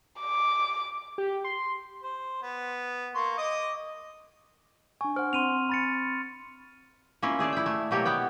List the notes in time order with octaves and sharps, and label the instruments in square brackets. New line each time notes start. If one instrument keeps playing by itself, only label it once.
[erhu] D6
[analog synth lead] G4
C6
[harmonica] C5
B3
A#3 C6 C#6
D#5 D6 D#6
[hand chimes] D4 G#5 [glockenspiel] C#6
[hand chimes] C5 F#5 [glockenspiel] F6
[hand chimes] C4 [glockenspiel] C6 D#7 F7
[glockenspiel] B5 A6 C#7
[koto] A#3 C#4 E4 F4
A3 G#4 D5 A5
E4 G5
A3
B2 F#3 A#3 G4 C#5
B3 G5